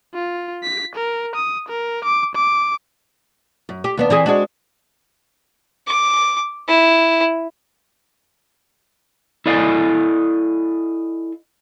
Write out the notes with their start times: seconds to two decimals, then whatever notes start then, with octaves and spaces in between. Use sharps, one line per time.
0.14 F4
0.63 B6
0.95 A#4
1.36 D#6
1.69 A#4
2.05 D6
2.35 D6
3.69 F#2
3.84 G4
3.97 D#2 B3 D4
4.10 E3 C4 G#4
4.26 G#3 D4 F#4
5.87 D6
6.68 E4
9.46 E4 A4 D5 D#5 F5 G#5